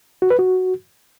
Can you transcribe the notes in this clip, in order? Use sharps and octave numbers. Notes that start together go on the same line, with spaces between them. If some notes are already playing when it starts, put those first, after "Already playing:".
F#4
B4
F#4